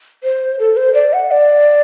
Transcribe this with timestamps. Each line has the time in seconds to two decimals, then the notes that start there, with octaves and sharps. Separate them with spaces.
0.23 C5
0.59 A4
0.77 C5
0.94 D5
1.13 F#5
1.31 D5